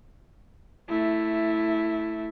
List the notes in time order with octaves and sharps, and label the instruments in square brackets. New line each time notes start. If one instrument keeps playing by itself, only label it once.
[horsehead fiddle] A3 E4